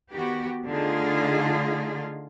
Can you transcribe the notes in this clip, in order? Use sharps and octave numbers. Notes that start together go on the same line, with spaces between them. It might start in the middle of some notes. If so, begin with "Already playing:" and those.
D#3 B3 F#4 G4
D3 A3 D#4 F4 G#4